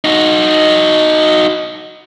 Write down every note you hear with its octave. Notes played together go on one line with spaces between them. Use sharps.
D#4 F#4